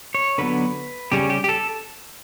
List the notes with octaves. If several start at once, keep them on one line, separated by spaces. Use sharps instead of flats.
C#5
D3 F#3 B3 B4
C#3 G3 C#4 G4
G4
G4
A4